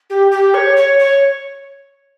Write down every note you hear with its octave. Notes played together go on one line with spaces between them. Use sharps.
G4
G4
C#5
C#5
C#5